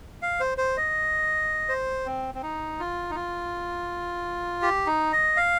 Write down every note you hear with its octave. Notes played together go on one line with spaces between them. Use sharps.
F5
C5
C5
D#5
C5
C4
C4
D#4
F4
D#4
F4
G4
D#4
D#5
F5